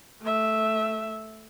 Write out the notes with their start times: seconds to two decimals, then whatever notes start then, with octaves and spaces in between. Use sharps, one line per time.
0.22 A3 E5